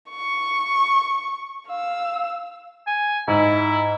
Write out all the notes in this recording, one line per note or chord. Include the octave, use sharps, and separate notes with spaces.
C#6
F5 E6
G#5
G#2 E4